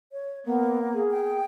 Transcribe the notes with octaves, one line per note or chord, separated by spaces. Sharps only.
C#5
A#3 B3
G#4
G5